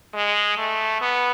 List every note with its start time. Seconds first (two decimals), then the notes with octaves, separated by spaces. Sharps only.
0.14 G#3
0.58 A3
1.01 B3